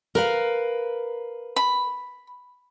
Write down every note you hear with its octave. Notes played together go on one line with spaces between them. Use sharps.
A#4 B4 F5
B5